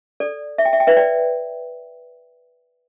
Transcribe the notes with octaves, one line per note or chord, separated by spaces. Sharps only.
A4 D5
E5
G5
E5
G5
B4 E5
D5 G5